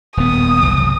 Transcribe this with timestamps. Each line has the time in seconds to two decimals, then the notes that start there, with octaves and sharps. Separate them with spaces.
0.17 D#1 B3 D#6
0.62 F#1 C2 E3